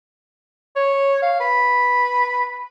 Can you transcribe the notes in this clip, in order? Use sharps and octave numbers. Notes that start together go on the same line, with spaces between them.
C#5
F5
B4